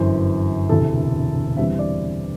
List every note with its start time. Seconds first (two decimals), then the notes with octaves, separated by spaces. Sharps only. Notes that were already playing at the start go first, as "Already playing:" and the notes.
Already playing: G1 F#2 E3 C5
0.69 E1 D2 C3 E3 A4
1.57 E2 D3 G3 C4 E5
1.79 D5